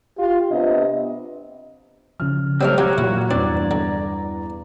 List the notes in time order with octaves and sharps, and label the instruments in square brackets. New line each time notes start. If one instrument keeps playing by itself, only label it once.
[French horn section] F4 G4
C3 B3 D4 D#5
[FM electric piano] C#3 F3 [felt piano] F6
[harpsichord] F#3 G3 A3 [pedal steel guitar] C4 A#4
[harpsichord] F#3 C4 G4 [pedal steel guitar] F#4 [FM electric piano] F5 A#5 G#6
[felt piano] A#2 F#3 [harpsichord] E4
[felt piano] E2 G2 [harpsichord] C4 [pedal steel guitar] D5
[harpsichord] D3 [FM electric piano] A#5